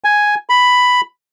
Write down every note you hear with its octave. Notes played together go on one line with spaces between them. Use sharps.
G#5
B5